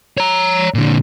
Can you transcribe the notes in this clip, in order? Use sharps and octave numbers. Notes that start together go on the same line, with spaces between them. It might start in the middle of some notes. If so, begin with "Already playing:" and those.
C#5 A#5
A#2 D3